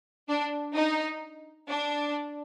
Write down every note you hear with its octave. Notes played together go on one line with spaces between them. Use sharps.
D4
D#4
D4